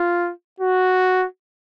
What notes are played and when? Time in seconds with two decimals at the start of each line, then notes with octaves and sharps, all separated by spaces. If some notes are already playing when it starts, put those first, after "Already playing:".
Already playing: F4
0.60 F#4